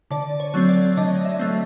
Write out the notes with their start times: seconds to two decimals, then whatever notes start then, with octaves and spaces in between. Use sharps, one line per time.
0.11 D3 D5
0.40 C#5
0.54 F#3 A3 C4
0.69 D5
0.97 D3 D#5
1.25 E5
1.39 F#3 A3 C4